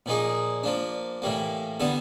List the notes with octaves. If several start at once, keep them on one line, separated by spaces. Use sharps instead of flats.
A#2 F3 A#3 D#4 G#4
F3 A#3 D4
A2 E3 G3 A#3
D3 G3 B3 E4 A4